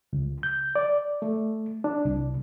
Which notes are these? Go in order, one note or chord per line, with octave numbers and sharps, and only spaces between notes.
C#2
G6
D5
A3
D4
C2